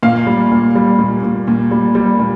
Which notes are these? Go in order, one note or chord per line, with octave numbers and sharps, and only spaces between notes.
A#2 F5
G3
A#2
G3
A#2
A#2
A#2
G3
G3
A#2